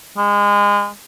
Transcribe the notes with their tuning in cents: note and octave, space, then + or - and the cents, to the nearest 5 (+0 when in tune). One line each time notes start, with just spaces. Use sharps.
G#3 -30